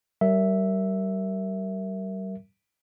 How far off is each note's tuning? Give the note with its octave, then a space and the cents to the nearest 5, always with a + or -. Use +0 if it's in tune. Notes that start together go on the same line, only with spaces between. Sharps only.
G3 -30 A#4 -5 E5 +0